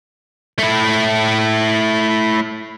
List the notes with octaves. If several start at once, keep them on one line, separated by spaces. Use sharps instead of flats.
A3 E4